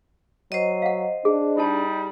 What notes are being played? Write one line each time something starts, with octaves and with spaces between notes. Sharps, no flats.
F#3 C5 D#5
F5 F#5
D4 G#4
G3 D#4 E4 A5 B5